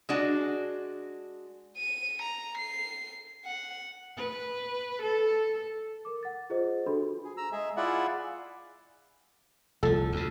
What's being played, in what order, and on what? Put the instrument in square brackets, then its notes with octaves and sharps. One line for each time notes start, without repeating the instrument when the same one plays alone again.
[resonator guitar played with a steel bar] G#3 D4 F#4
[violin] D#7
A#5
C7
F#5
[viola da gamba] B4
A4
[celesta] A#4 D6
F#5 A6
F4 G#4 B4 C5 D#5
D4 F#4 A4 B4 B5 C6
[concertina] G#4
A#5 E6
G#3 G#4 E5
E4 F4 G#4 D5 E5 F#5
[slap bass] C2 F3 [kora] A4
[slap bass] D2 C#3